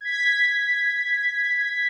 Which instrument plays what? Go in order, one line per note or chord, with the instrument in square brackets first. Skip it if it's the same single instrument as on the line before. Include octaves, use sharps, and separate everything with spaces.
[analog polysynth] G#6 B6